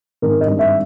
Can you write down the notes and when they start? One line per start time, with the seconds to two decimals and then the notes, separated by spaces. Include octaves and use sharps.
0.22 G#1 A#4
0.41 D#5
0.46 G2
0.59 E5